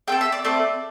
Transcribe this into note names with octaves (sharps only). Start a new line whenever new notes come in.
A3 C4 A4 G5
E5
D5
A3 C4 A4 D5